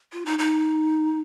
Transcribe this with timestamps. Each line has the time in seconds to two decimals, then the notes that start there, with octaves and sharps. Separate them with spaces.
0.12 F4
0.26 D#4
0.39 D#4